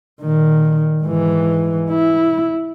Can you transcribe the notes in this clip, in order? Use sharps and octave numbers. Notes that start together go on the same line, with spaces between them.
A#2 D#3
G#2 E3
E4